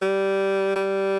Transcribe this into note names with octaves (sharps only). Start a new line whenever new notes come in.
G3
G3